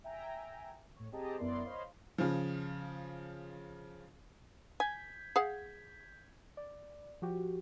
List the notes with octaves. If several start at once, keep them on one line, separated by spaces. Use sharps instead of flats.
E5 G5 G#5 A#5
A2 C#5
C4 G4 G#4 D#5 A5 A#5
F#2 B3 E4 A#4 D5 C6
C5 C#5 D#5 F5 B5 C6
C#3 F3
G#5 G6 G#6 B6
G#4 F5 F#5
D5
F3 F#4 G4